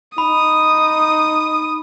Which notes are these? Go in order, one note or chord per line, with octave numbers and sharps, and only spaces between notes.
D#4 B5 D#6